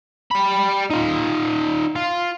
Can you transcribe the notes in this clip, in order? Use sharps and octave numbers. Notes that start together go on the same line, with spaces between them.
G3 B5
D#4 F4
F4